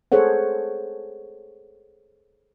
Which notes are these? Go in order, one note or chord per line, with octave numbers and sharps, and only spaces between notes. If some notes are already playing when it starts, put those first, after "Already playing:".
G#4 A4 C5 C#5 F#5